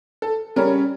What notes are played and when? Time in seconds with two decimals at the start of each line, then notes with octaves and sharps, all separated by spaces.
0.22 A4
0.56 C#3 G3 C#4 A#4